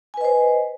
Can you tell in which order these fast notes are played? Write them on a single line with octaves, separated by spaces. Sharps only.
G#5 B4 D#5 C5